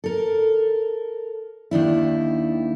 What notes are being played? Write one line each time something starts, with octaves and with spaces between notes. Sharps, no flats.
A4 A#4
D#2 D#3 D4 E4